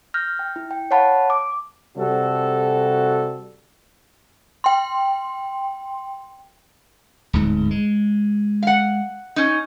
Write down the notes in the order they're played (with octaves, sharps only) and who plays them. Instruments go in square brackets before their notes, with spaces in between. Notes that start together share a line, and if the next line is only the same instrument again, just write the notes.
[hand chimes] F6 G6 A#6
G5
E4
G5
C#5 F5 F#5 A5 B5
D6
[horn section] C3 G3 F#4 A4
[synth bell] G5 C6
[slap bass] D1 G#2
G#3
[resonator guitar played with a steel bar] F5 F#5
C#4 D#4